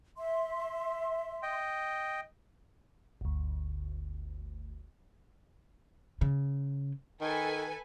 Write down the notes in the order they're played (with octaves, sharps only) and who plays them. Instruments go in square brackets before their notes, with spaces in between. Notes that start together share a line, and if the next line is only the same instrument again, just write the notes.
[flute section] E5 C6
[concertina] D#5 G5
[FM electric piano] G1 D2
[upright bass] C#3
[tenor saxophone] D#3 [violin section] A4 B4 G#5